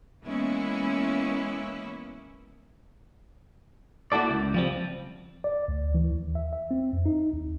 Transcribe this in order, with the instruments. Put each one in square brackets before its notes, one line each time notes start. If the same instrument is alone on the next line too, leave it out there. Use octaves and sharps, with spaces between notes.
[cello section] E3 G#3 A#3 B3 C#4 E4
[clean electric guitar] A#3 E4 F#4 A4 D5
C#2
F3 G3 C4
[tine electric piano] D5
D2
E3
D#2
E5
E5
C4
F2
D#4
D#2